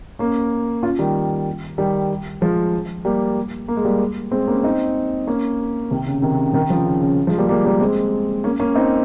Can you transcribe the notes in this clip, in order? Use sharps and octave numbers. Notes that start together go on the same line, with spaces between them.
A#3 C#4
C#4 F4
D#3 G3
D#3 G3
F3 G#3
G3 A#3
A#3
G#3
G3 A#3
G#3 C4
A#3 C#4
C4 D#4
A#3 C#4
C3 D#3
C#3
C3 D#3
C#3
C3 D#3
C#3 F3
C#3
C#3
F3 G#3
G3 A#3
G3 A#3
G3 A#3
G#3 C4
A#3 C#4
A#3 C#4
C4 D#4